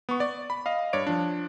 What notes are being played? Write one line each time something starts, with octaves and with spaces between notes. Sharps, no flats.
B3 C#6
D5
B5
D#5 F5
G2 C#5 D5 D7
F3 D4